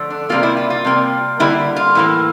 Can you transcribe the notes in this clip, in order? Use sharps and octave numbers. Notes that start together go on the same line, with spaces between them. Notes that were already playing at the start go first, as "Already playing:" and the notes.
Already playing: D3 F3 A3
D4
C3 G3 A#3 F4
E4
F4
F4
C3 G3 A#3
D3 G3 A#3 E4
F4
A2 E3 A#3